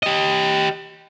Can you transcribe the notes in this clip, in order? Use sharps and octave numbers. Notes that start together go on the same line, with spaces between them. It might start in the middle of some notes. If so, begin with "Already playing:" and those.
G4 D#5